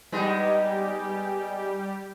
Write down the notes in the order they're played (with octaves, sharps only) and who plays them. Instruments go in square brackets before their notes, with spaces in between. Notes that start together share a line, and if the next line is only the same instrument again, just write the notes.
[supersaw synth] G3 G4 [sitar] G#3 B3 D#4